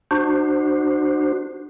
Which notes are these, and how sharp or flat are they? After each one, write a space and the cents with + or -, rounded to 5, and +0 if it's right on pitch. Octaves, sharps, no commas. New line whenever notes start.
D4 +35 F#4 +0 C5 +0